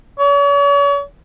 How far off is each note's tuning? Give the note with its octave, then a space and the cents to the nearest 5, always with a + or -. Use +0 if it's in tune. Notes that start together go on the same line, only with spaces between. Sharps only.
C#5 +40